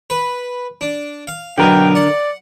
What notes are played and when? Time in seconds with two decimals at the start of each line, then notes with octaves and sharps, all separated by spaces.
0.10 B4
0.81 D4
1.27 F5
1.58 B1 B2 D3 A#4 G5
1.95 D5 F#5